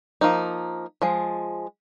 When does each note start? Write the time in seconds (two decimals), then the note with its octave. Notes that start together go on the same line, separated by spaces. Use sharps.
0.21 F3 A#3 D#4
1.02 F3 G#3